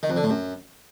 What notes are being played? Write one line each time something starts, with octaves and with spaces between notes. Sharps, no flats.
D#3
F2
D3
A2
F#2